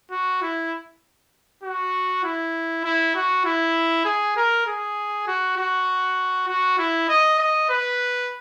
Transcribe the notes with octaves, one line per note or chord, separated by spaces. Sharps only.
F#4
E4
F#4
E4
E4
F#4
E4
G#4
A#4
G#4
F#4
F#4
F#4
E4
D#5
D#5
B4